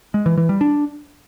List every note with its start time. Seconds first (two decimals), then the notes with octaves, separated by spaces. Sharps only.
0.14 G#3
0.26 E3
0.37 E3
0.49 G3
0.61 D4